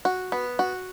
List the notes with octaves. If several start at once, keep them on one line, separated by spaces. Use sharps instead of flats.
F#4
B3
F#4